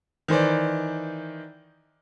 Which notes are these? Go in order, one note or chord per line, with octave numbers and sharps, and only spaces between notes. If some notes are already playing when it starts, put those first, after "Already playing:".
D#3 E3 C5 D5